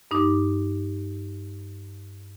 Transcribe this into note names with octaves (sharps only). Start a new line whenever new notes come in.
G2 D#4 D6